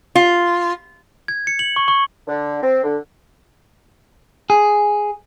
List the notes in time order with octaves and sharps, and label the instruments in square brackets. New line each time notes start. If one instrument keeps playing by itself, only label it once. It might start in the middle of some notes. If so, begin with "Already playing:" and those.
[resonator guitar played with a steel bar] F4
[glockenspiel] G#6
C#7
F#7
C#6
C#6
[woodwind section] D3
C4
D3
[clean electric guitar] G#4